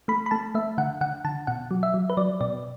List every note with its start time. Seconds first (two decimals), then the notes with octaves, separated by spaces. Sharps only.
0.08 A3 B5
0.26 B5
0.31 A3 A5
0.55 A3 E5
0.78 D3 F#5
1.01 D3 F#5
1.25 D3 A5
1.47 B2 F#5
1.71 F#3
1.83 E5
1.94 F#3
2.10 B4
2.17 F#3 D5
2.41 B2 D5